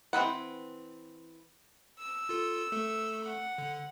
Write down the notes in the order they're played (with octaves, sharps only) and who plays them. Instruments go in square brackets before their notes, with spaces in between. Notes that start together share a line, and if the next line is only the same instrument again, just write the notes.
[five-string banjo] E3 C4 B4 F#5
[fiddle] E6
[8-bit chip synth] F4 A4
A3 A4
[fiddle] F#5
[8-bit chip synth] D3